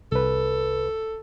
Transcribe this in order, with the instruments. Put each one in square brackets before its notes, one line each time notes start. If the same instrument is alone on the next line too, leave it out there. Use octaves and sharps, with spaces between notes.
[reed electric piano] C2 B4 [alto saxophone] A4